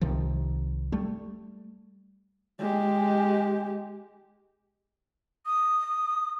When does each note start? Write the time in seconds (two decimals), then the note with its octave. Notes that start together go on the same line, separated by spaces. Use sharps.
0.01 C2 C3 D#3 F3
0.92 G3 A3
2.59 G#3 G4
5.46 D#6